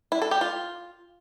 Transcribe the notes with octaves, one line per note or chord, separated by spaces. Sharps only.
E4
A4
G4
F4